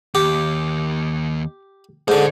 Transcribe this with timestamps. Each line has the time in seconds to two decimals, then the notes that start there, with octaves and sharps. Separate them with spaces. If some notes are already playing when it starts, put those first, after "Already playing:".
0.15 D#2 G4
2.08 G#2 D3 C5 D#5